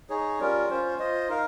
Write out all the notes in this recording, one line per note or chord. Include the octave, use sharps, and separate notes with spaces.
D#4 G#4 C#5
G3 C#4 F4 A#4
C#4 F4 C5
F4 C5 D#5
D#4 A#4 F5